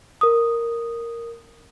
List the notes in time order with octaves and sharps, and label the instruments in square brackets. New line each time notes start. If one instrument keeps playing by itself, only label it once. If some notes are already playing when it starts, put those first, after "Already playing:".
[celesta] A#4 D#6